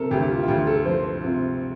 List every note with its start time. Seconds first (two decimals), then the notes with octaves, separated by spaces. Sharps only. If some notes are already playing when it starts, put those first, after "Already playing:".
Already playing: C3 A4 A#4
0.11 D2 G4
0.22 G4
0.30 F4
0.43 F4
0.48 D2 G4
0.67 A4
0.85 F3 C5
1.04 C5
1.22 C3 F4